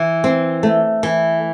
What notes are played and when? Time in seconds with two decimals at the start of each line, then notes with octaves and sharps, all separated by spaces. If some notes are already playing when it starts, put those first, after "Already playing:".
Already playing: E3
0.24 C4
0.63 A3
1.03 E3